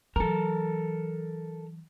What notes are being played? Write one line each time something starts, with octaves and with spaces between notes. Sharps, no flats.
E3 F#3 A4 A#4